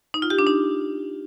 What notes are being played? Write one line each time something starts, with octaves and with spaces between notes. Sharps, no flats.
D#4
F4
G4
D4
D#4